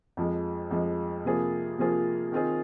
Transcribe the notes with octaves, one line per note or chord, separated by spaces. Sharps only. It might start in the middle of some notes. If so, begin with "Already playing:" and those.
F2 F3 G#3
F2 F3 G#3
C3 F3 A#3 F4 G#4
C3 F3 A#3 F4 G#4
D#3 C4 F4 G#4